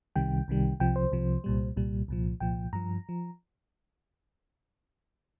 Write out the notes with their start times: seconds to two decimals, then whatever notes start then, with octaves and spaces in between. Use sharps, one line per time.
0.16 C2 C3 D#3 G3 G5
0.48 C2 C3 D#3 G3
0.80 C2 C3 F3 G5
0.96 C5
1.12 C2 C3 F3
1.44 C2 A#2 G3
1.76 C2 A#2 G3
2.08 C2 A#2 F3
2.40 C2 A#2 F3 G5
2.73 G2 F3 A#5
3.09 F3